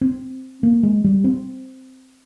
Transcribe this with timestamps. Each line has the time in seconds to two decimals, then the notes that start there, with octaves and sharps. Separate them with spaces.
0.01 C4
0.63 A#3
0.83 G#3
1.04 G3
1.24 C4